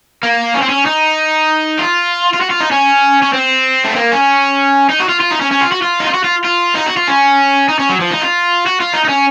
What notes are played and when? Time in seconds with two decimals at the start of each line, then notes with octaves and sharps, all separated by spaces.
0.23 A#3
0.54 C#4
0.62 C4
0.69 C#4
0.85 D#4
1.79 F4
2.33 F4
2.41 F#4
2.50 F4
2.61 D#4
2.71 C#4
3.23 C#4
3.33 C4
3.85 A3
3.96 A#3
4.12 C#4
4.89 D#4
5.00 F#4
5.09 F4
5.21 F4
5.31 D#4
5.41 C#4
5.52 C#4
5.61 F4
5.72 F#4
5.82 F4
6.00 D#4
6.07 F4
6.14 F#4
6.24 F4
6.44 F4
6.75 D#4
6.86 F#4
6.97 F4
7.07 C#4
7.69 D#4
7.79 C#4
7.89 F#3
8.00 F3
8.11 D#4
8.22 F4
8.66 F#4
8.80 F4
8.93 D#4
9.05 D#4
9.09 C#4